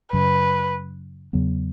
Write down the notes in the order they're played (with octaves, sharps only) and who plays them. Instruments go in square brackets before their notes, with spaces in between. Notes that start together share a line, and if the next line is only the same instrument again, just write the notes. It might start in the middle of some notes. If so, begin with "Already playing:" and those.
[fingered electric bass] F#2 C#3 F#3 [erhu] B4
[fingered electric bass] E2 C#3 F#3 B3